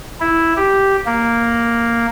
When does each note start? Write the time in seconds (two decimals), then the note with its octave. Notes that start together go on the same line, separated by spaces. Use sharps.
0.20 E4
0.57 G4
1.06 A#3